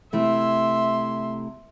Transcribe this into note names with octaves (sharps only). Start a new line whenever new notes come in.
C3 A3 E4 E5 C6